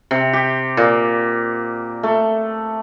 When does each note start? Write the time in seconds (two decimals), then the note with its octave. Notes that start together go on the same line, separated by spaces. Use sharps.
0.11 C3
0.33 G4
0.77 A#2
2.03 A3